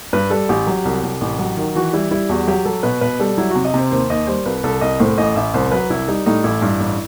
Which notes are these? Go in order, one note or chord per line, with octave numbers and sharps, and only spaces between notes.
G2 B4
G3 A4
A1 G4
F#3
C2
C2
A1
F#3
D#3
E3 F#4
G3 E4
G3 E4
E2 F#4
F#3 G4
F#3 A4
B2 B4
B2 B4
G3 A4
F#3 E4
C3 F#4
D#5
C3 C5
D#2 C5
D#2 D#5
G3 C5
C2 B4
C2 A4
C2 D#5
A2 C5
A1 D#5
A1 E5
C2 C5
F#3 B4
C2 E4
G3 D#4
A2 D#4
A1 E4
G2
A1